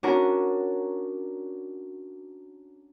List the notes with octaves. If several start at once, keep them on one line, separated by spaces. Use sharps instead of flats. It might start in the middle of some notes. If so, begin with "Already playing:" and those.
C#4 D4 F#4 A#4